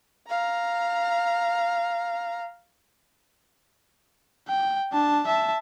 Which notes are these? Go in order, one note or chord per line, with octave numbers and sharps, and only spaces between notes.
F5 A#5
G5
D4 A5
E5 A5